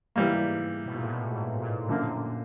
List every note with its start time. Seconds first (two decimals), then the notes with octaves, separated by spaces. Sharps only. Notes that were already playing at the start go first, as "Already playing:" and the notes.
0.16 G#2 E3 G3 A#3
0.86 B2
0.94 A#2
1.02 A2
1.31 G#2
1.59 A#2
1.89 F#2 A#2 D3 F3 A#3